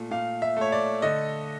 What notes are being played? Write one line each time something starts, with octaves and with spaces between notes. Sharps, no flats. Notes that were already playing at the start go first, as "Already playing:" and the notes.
Already playing: A#2 A3
A#2 F5
E5
A3 C#5
D5
D3 D#5